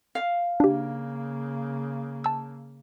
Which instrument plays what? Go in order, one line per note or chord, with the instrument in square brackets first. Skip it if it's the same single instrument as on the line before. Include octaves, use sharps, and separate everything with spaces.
[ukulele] F5
[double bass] C#3 A#3 [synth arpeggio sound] D4 G4
[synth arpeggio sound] A5 E6